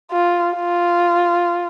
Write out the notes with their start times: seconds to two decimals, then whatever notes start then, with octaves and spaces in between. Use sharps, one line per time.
0.11 F4
0.55 F4